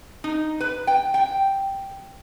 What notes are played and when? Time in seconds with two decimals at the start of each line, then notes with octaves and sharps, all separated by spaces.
0.24 D#4
0.60 B4
0.87 G5
1.14 G5